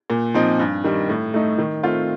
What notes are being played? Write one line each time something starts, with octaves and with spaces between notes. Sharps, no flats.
A#2
F3 C4 D#4
G2
D#3 G3
A2
A3 D#4
D#3
A3 C4 F4